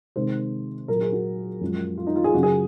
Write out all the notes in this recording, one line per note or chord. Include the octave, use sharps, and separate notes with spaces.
C3 D#3 G#3 C5
A#2 F#3 A#4
G#4
F#4
F#2 F3 G#3
F4
D#4
F4
G#4
F#2 C#3 F#3 F#4
G#4